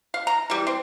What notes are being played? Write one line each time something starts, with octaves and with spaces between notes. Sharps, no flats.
F5
A#5
E3 G3
C4